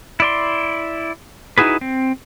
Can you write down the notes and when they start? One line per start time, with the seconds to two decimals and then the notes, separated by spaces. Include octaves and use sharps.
0.20 E4 D5 C6
1.58 D#4 E4 F#4 G#4 B4
1.81 C4